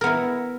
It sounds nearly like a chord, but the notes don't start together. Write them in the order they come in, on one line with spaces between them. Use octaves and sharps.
A#4 B3 E4